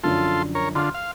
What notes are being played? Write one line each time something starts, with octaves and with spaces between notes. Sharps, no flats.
F#2 D3 F3 F4 A4 C6
A#4 C#5
D3 F4 C6 F6
F5